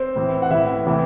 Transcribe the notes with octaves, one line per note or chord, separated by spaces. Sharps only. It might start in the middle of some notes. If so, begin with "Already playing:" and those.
Already playing: C4 C5
A2 E3
F#5
A2 E3 E4 E5
C3 E3